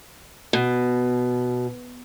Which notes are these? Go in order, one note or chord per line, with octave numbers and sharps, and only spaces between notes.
B2